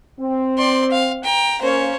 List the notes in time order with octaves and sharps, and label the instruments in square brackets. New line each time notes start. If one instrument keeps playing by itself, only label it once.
[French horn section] C4
[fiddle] D5 C6
F5
G5 A#5
[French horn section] A#3 C#4 [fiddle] C5 C#5